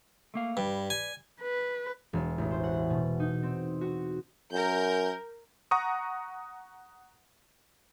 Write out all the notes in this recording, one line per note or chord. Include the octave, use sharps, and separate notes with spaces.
A3 A#3 F5
G2 B4 D5
G#5
B4
E1
A1
C5
F#5
B2
D#4
C4
F#4
F#2 A#4 G6
F#5 A#5 C#6 D#6